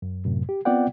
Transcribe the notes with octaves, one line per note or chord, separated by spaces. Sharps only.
F#2
F#2 A2 C3
G4
B3 C4 F4 D5 F#5 G5